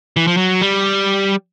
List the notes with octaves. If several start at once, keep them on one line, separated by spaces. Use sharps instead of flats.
E3
F3
F#3
G3